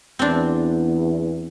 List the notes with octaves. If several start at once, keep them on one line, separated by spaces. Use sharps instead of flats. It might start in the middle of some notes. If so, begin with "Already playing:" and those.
E2 C4 D4